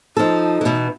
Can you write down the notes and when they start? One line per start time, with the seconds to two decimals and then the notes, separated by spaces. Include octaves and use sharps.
0.17 F3 D#4 A4
0.61 B2 E3